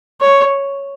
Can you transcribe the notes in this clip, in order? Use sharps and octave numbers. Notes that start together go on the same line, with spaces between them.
C#5